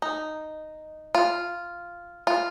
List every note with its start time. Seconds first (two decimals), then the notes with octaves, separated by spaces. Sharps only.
0.02 D#4
1.15 F4
2.27 F4